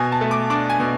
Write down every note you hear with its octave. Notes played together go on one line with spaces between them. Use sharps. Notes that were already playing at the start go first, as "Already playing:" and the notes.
Already playing: B2 G#5
A5
A3
D6
D4 D6
G#5
B2